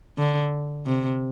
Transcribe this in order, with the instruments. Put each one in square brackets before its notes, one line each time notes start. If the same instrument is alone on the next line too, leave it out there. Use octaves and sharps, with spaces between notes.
[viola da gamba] D3
C3